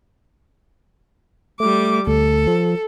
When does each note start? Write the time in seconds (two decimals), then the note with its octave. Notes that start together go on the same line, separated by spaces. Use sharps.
1.60 G3 A3 D6
2.07 D2 A4
2.47 F3